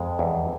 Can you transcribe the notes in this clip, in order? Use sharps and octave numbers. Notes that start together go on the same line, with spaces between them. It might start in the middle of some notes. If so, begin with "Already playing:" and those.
Already playing: F2 G#3
E2